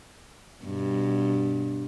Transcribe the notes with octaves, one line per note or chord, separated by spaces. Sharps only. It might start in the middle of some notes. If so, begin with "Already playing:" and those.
G2 B2